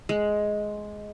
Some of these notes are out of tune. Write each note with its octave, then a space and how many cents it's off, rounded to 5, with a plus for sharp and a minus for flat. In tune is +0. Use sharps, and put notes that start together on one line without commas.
G#3 +10